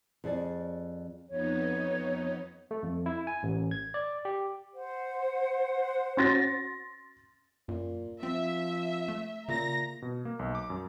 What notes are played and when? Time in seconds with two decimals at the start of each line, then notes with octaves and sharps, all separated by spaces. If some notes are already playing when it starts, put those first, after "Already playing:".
0.24 F2 G#4 D5
1.29 F2 B3 D#4 C#5
2.71 A3
2.83 F2
3.06 E4
3.27 G#5
3.43 A1
3.71 G#6
3.94 D5
4.25 G4
4.73 C5 F#5
6.17 C#4 F#4 C6 A6 A#6
7.68 F#2 A#2
8.23 F3 C4 E5
9.08 A3
9.48 A#2 C#3 A#5 A#6
10.02 B2
10.25 A#3
10.39 B1
10.55 D6
10.70 F#2